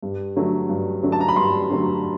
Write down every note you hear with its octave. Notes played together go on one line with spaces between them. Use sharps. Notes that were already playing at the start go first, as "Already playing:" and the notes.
G2
D3 F#3 A3
G2
D3 F#3 A3
A5
A#5
B5
G2 C6
D3 F#3 A3